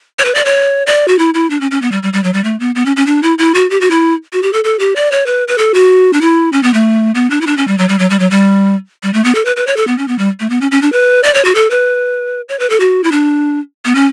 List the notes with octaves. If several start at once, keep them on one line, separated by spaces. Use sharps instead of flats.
C#5
B4
D5
C#5
D5
F#4
E4
E4
D4
C#4
C#4
B3
G3
G3
G3
F#3
G3
A3
B3
B3
C#4
C#4
D4
E4
E4
F#4
G4
F#4
E4
F#4
G4
A4
A4
G4
D5
C#5
B4
B4
A4
F#4
D4
E4
C#4
B3
A3
B3
D4
E4
D4
C#4
G3
F#3
G3
F#3
G3
F#3
G3
G3
A3
B3
A4
B4
B4
C#5
A4
B3
C#4
B3
G3
A3
B3
C#4
C#4
D4
B4
D5
C#5
F#4
A4
B4
C#5
B4
A4
F#4
E4
D4
B3
C#4